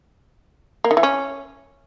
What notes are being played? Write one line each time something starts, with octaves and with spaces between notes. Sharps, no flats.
A#3
D#3
E3
C#4